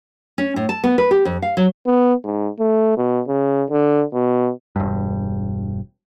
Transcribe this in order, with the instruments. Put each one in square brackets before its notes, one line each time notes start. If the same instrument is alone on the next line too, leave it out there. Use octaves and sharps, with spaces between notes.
[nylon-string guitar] C#4
A2
A5
B3
B4
G4
F2
F5
F#3
[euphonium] B3
G#2
A3
B2
C#3
D3
B2
[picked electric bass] E1 G2